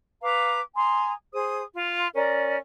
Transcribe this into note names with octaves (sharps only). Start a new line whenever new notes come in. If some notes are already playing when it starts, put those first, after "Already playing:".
B4 F5 A#5 D6
G#5 A#5 C6 D#6
G#4 C5 D#6
F4 C6
C#4 A#4 D5 D#5